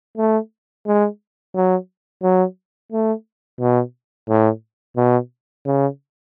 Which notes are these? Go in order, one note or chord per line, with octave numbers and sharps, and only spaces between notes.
A3
G#3
F#3
F#3
A3
B2
A2
B2
C#3